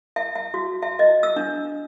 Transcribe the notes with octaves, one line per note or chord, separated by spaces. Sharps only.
E5
E5
F#4
E5
D#5
E6
D4